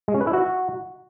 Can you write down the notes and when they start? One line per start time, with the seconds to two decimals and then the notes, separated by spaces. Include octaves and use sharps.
0.08 G#3
0.14 C#4
0.21 B4
0.27 E4
0.33 F#4